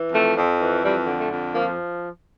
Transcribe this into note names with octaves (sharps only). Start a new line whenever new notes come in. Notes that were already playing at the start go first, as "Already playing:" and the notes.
Already playing: E3
F2 A3
F2
E3
F2 G3
D3
A3
F2
F3 A#3